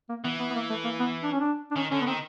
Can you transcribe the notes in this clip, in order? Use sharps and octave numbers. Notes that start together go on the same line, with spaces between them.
A#3
E3 B3
B3
B3
A#3
A3
A#3
B3
D4
C#4
D4
D4
D#3 C#4
D3 C#4
B3
D#3 C4